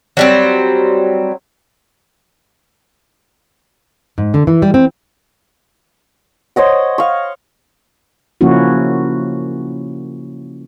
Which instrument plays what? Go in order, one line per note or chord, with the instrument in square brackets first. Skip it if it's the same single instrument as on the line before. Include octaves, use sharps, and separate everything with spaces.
[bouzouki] F#3 G3 C4
[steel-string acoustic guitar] G#2
D3
E3
G3
C4
[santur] C5 C#5 D#5 F#5
F5 C#6
[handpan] C#3 F3 A#3 C#4 E4 F#4